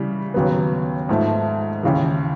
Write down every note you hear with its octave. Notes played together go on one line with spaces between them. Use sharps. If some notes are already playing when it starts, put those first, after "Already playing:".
Already playing: C#3 E3 G3
D#2 C#3 F#3 B3
G#2 F3 A3
D#2 C#3 E3